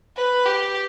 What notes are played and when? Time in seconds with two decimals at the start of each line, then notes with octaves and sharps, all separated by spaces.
0.17 B4
0.46 G4